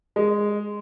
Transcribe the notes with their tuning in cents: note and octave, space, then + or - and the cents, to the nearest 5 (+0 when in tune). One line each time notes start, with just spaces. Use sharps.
G#3 -5